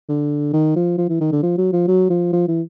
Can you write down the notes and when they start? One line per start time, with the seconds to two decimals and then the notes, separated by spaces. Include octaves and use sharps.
0.09 D3
0.53 D#3
0.76 F3
0.98 F3
1.09 E3
1.21 D#3
1.32 D3
1.43 F3
1.58 F#3
1.73 F3
1.88 F#3
2.10 F3
2.33 F3
2.48 E3